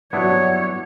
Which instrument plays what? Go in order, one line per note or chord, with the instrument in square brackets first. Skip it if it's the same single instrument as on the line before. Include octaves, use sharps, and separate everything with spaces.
[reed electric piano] G2 F#3 [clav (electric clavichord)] B3 D4 E4 [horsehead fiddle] C#5